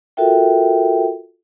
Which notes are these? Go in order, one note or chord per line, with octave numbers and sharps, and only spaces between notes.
F4 F#4 A4 A#4 E5 G5